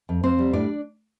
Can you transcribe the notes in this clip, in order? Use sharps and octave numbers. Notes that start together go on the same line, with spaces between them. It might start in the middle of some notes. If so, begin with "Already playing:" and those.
F2
F2 C4 C5
G3
A2 D4 D5